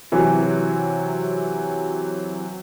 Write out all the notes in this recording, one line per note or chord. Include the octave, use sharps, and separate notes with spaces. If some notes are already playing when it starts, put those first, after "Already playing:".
C3 E3 F#3